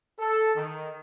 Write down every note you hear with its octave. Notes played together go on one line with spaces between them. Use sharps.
A4
D#3